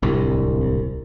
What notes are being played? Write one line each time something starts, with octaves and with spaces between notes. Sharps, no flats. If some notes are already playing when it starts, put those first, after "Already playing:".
D1 C2